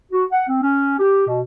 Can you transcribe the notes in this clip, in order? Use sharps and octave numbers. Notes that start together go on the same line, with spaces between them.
F#4
F#5
C4
C#4
G4
B2